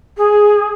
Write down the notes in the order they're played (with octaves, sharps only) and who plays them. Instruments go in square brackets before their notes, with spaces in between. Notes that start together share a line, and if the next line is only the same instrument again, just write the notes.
[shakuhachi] G#4